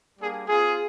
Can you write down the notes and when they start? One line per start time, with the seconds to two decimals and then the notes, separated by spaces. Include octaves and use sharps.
0.19 G3 A#3 D4 G#4
0.48 C4 F4 G#4